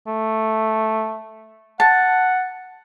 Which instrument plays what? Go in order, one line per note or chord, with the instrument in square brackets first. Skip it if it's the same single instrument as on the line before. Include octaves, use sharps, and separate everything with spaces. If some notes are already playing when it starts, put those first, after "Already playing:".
[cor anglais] A3
[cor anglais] F#5 [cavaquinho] A5